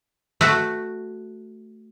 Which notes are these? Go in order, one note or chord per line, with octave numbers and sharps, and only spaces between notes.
A3 F#4